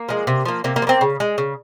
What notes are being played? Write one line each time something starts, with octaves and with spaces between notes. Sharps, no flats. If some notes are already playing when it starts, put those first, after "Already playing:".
Already playing: A#3
F3 G#3
C3
F3 A#3
C3 A#3
A#3
F3
A#3 C4
C#3
G#3
C#3